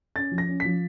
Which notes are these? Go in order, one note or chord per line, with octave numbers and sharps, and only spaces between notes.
C#4 A6
F3
A#6
C#4
F3 B6